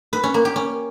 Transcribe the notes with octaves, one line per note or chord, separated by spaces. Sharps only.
B4
C#4
A#3
G4
C#4